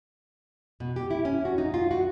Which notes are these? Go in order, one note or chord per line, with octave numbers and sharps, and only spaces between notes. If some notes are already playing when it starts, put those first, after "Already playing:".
B2
G4
E4
C#4
F#4
D#4
F4
F#4